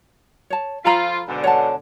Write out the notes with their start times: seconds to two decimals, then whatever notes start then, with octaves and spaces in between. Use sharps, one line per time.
0.50 C#5 A5
0.85 F3 F4 A4 A#5 B5
1.28 G#2 B2 D3
1.44 C#5 F#5 A5